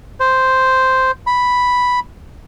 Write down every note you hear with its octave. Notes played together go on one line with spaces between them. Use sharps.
C5
B5